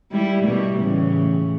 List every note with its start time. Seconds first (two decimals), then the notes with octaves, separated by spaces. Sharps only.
0.12 G3 E4
0.43 B2 G3 A3
0.80 A2 C#3 E3